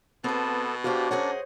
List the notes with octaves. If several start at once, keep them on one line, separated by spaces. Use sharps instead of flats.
B2 B3 C4 G#4 A4 A5
D4 F#4 G4 C5 F5
F#2 G#4 C5 C#5 D#5 F#5